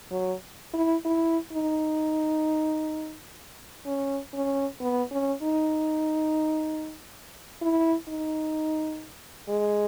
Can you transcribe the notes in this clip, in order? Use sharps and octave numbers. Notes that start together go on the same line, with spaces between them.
F#3
E4
E4
D#4
C#4
C#4
B3
C#4
D#4
E4
D#4
G#3